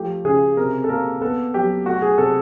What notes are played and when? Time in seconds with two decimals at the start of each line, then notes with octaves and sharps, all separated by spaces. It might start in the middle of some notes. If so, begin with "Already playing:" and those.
Already playing: F3 A3 G4
0.25 C#3 G#4
0.57 C3 A#4
0.84 A4
0.89 A#3 A#4
1.21 B3 A4
1.54 F#3 G4
1.86 A3 F#4
2.02 G#4
2.18 C3 A4